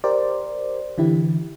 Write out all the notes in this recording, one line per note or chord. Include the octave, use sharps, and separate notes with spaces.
G4 A#4 C5 D5
D3 E3 E4 G4